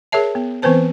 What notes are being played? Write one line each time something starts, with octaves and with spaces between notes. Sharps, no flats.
G#4 A#4 C#5 E5 A5
B3
E3 B3 C4 B4 C5 A5